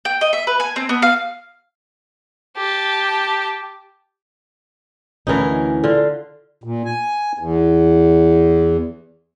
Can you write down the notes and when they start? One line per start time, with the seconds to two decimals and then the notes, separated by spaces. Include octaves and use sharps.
0.05 G5
0.21 D#5
0.33 E5
0.47 B4
0.60 G#5
0.76 C4
0.89 B3
1.02 F5
2.56 G4 A5
5.27 D2 E3 C#4 D#4 A#4
5.84 D3 F4
6.64 A#2
6.85 G#5
7.39 E2